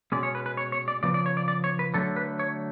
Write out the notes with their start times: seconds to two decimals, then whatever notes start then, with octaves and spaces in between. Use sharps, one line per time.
0.12 B2 G#3 C#4 D5
0.23 C#5
0.35 B4
0.46 B4
0.57 C#5
0.72 C#5
0.88 D5
1.03 C#3 F3 B3 D5
1.14 D5
1.26 C#5
1.37 D5
1.48 D5
1.64 C#5
1.79 B4
1.94 D3 F#3 A3 A4
2.16 B4
2.39 C#5